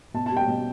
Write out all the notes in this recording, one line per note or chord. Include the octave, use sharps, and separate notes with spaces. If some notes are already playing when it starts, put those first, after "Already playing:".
B2 A5
A5
G3 G5
B2